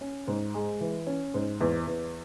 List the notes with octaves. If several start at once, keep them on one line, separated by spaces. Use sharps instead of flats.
C#4
G#2
G#3
E3
C#4
G#2
E2
E2